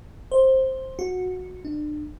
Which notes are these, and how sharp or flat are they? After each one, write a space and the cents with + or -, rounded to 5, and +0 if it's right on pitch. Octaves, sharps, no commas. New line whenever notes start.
C5 +10
F#4 -15
D4 +35